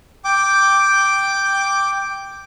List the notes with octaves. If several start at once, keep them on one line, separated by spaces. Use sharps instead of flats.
G5 D6